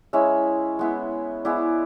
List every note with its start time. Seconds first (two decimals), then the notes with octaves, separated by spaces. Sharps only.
0.13 G#3 C#4 E4 E5
0.79 G#3 B3 E4
1.45 G#3 B3 E4 D5